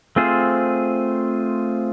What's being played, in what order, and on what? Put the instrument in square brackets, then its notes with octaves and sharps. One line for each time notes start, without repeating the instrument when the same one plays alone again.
[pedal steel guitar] A3 C4 F4 G#4 C5